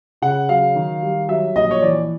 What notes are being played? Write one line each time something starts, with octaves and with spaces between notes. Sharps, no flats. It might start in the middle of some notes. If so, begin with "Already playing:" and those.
C#3 F#5
F#3 F5
D#3
G3
F#3 E5
A#1 D#5
C#5
E3 D5